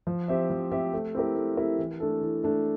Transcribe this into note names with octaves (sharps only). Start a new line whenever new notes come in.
F3
C4 G4 C5 E5
F3
C4 G4 C5 E5
A3
C4 E4 G4 A#4
A3
C4 E4 G4 A#4
E3
A3 D4 A4
E3
A3 D4 A4